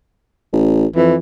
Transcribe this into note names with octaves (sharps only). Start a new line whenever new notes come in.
A1
F2 E3